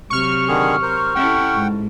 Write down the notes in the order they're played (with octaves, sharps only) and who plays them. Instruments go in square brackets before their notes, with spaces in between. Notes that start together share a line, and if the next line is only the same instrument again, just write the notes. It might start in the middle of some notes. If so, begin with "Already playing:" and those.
[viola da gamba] C3 F#3 [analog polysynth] C#6 F6
[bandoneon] D3 D#3 G#4
A#4 C5
[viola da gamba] C#4 E4 A4 [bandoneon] F#5 G5
[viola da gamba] G#2